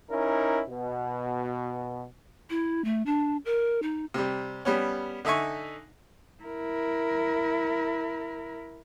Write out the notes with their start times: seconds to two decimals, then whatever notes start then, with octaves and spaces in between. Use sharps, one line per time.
0.10 C#4 D#4 E4 A#4
0.68 B2
2.50 E4
2.84 A3
3.06 D4
3.45 A#4
3.82 D#4
4.14 C3 G3
4.65 G3 B3 C#4
5.25 D3 D#4 E5 G#5 C#6
6.44 E4 A#4